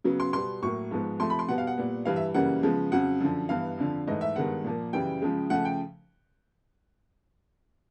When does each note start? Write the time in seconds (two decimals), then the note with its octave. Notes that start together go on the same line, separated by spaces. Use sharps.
0.04 C#3 F#3 B3
0.20 C6
0.33 B2 G3 B3 C6
0.63 A2 F#3 A#3 C#6
0.91 G#2 F3 G#3 B3
1.20 C3 F3 A3 C6
1.30 B5
1.39 C6
1.48 B2 G3 B3 F#5
1.58 F5
1.67 F#5
1.78 A#2 G3 B3
2.05 G2 E3 G3 F5
2.16 E5
2.34 F#2 C#3 E3 G3 A#3 F#5
2.63 C#3 F3 G#3 B3
2.92 F2 C#3 F#3 F#5
3.21 F#2 D3 F3
3.49 G2 E3 G3 B3 F5
3.78 F2 D3 F3
4.07 G#2 E3 A3 D#5
4.21 E5
4.36 G2 D#3 G#3 B3 F#5
4.64 A#2 F3 A#3
4.93 F#2 C#3 E3 G3 G5
5.22 C#3 F3 G#3
5.50 C#3 F3 A3 F#5
5.65 G5